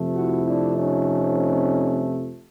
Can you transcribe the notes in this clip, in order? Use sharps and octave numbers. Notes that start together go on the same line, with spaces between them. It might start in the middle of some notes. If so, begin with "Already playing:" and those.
Already playing: F2 C3 F3 A3
E4 F#4
D4 E4
C#4 D#4